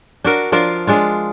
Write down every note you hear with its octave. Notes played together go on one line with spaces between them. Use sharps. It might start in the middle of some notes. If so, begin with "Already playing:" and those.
D4 F#4 A#4
F3 D4 F4 A#4
G#3 D4 F4